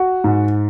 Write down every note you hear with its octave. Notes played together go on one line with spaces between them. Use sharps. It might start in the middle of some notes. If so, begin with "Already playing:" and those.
Already playing: F#4
G#2